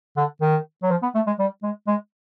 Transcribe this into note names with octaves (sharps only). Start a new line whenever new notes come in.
D3
D#3
F#3
F3
B3
A3
G#3
G3
G#3
G#3